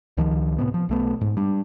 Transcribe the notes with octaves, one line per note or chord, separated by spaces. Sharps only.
C#2 D#3 F3
A2 C3 B3
F3
B1 A3 B3
G#2
G3 D4